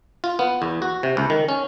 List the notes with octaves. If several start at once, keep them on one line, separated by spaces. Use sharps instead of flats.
F4
B3
E2
F#4
C3
C#2
D#3
C#4